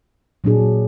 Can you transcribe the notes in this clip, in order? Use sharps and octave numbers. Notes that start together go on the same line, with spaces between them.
A#2 F#3 D4 G#4